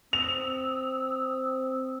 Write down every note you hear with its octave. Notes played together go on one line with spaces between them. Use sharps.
C4 D#6 E6 F7